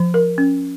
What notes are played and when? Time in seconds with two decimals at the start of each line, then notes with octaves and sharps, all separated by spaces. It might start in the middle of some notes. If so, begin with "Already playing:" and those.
Already playing: F3
0.14 A#4
0.38 C#4